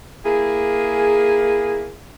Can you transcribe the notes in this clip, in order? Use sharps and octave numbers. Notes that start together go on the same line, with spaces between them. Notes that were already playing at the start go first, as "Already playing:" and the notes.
A#3 E4 G#4